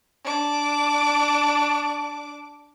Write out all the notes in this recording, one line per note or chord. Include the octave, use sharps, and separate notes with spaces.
D4 D6